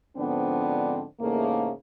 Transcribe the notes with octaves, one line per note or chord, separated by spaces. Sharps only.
G#2 D3 F3 B3 C4 D4
E2 G#2 C#3 A3 A#3